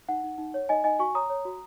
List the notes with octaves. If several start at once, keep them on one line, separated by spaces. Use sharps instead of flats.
D#4 F#5
D#4
D#4
C#5
D#4 D#5 G#5
D#4 D#5 G#5
F#4 G#5 C#6
C#5 A#5 D#6
C#5
F#4